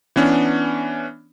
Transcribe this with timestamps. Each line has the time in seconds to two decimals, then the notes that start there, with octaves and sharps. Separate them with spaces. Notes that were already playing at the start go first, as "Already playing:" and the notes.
0.16 E3 B3 C#4 D4